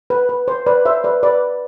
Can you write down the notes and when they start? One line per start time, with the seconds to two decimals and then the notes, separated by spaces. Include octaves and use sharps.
0.10 B4
0.29 B4
0.48 C5
0.66 B4 D5
0.86 C5 E5
1.04 B4 D5
1.23 B4 D5